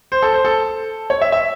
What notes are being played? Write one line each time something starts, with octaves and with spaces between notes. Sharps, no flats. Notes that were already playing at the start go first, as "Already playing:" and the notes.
C5
A4
C5
A4
C#5
E5
E5